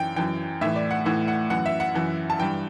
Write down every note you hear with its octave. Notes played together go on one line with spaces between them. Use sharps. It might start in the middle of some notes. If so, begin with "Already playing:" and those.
Already playing: F#2 E3 G5
F#2 E3 G5
A2 E3 E5
D5
F#5
A2 E3 F#5
F#5
F#2 E3 F#5
E5
F#5
F#2 E3
A5
G2 E3 G5